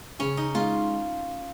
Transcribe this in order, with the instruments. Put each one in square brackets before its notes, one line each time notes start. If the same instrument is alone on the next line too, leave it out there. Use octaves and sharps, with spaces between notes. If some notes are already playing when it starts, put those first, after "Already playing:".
[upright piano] C#3 [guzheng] C#4
[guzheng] D#4
[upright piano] G#3 [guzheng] F4